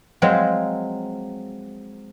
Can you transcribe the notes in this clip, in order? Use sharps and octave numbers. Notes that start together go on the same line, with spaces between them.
F3 F#3 G#3 C4